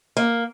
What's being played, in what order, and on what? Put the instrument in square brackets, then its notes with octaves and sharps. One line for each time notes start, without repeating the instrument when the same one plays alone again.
[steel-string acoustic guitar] A#3